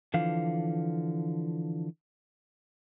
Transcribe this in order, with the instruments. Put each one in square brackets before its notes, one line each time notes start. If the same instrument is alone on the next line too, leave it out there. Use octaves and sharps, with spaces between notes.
[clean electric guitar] D3 E3 F3 F5